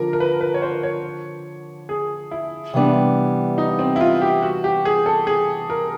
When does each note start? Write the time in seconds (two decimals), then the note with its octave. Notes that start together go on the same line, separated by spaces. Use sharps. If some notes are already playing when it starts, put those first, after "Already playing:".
Already playing: D3 F3 A#4
0.13 A#4
0.20 B4
0.41 B4
0.54 C#5
0.62 C5
0.83 C#5
1.89 G#4
2.31 E4
2.73 C3 E3 G3 B3 D4
3.58 D#4
3.79 C4
3.96 E4
4.01 F4
4.22 G4
4.42 F#4
4.64 G4
4.85 G#4
5.06 A4
5.27 G#4
5.70 A#4